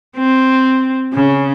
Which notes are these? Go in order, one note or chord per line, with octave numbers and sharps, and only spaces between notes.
C4
C#3